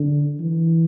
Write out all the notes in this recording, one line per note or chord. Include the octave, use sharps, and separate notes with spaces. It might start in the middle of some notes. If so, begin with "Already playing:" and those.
Already playing: D3
E3